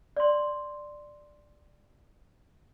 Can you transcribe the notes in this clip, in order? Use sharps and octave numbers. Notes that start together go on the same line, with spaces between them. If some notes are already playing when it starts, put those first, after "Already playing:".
D5 C6